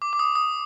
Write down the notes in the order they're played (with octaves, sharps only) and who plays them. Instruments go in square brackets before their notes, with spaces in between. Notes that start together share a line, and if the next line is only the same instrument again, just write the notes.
[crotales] D6
D6
D#6
D6
D#6